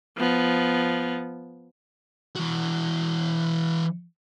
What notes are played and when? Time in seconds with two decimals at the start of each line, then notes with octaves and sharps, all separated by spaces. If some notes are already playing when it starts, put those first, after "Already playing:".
0.17 F3 B3
2.36 E3 F#4